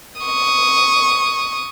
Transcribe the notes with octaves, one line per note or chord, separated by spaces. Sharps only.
C#6 D#6